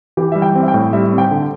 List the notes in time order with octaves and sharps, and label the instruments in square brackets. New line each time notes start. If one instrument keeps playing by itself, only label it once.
[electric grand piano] E3 [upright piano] G4
[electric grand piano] G3 [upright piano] E5
[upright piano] G5
[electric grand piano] C4
[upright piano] E5
G5
[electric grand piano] A2
[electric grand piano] G3 [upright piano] E5
[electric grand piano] C4
[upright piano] G5
[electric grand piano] D3